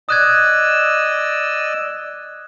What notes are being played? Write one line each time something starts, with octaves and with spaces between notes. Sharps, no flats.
D5 D#5 D#6 E6 F#6 G#6